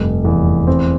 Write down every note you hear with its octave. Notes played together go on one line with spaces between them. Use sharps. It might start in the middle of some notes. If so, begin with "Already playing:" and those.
Already playing: F1 G2
E2
C4